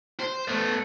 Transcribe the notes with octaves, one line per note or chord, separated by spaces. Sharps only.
C5
A3 B3